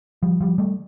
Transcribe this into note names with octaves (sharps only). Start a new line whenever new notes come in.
F3 G3
F3 G3
G3 A3